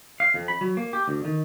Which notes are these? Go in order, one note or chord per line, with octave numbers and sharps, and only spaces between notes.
F5
F2
B5
F#3
A#3
G4
D2
D#3